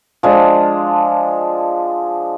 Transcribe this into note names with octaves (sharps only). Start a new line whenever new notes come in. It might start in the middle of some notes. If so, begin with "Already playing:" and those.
F3 G#3 D4